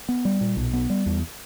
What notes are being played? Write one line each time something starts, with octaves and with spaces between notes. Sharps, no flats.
B3
G3
A#2
B1
B3
G3
E2